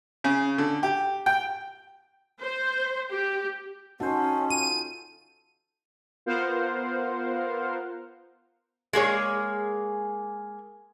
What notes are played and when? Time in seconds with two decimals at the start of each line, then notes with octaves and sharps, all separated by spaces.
0.24 C#3
0.58 D3
0.83 G4
1.26 G5
2.40 C5
3.11 G4
4.00 C#4 D#4 F#4 A4 C5 F#5
4.50 F4 D#7
6.26 B3 F4 A#4 C5 F5 F#5
8.93 G#3 A#3 G#4 C#5